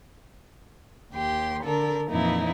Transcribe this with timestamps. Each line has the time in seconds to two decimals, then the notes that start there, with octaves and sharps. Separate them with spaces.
1.13 D#2 G4 C6
1.64 D3 A4 A#4
2.10 F2 A#2 E3 D#4 E4